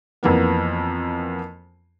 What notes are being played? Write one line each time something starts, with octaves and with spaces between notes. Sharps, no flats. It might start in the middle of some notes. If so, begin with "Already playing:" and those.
F2 E3 A#3 B3